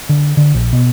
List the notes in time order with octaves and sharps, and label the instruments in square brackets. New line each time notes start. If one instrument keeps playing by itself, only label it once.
[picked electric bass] D3
D3
A#1
B2